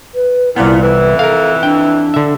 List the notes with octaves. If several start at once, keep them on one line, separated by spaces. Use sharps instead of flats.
B4
C2 A#2 B3 E4
F2 E3 B4
A4 A#4 F5
D4 G5
D3 E5